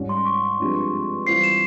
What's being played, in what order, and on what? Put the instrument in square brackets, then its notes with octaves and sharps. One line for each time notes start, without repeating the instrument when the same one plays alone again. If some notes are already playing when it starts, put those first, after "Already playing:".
Already playing: [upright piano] G#2 G3 C#4
[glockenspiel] C6
C#6
[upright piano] G2 F3 G#3 C4 G4
[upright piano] E3 G3 C4 F4 C5 [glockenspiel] C7
[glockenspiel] E7